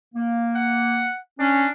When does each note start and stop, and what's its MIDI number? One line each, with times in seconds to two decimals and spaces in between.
0.14 1.07 58
0.56 1.19 78
1.40 1.68 61
1.40 1.71 62